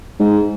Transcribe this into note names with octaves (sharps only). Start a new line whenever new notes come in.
G#2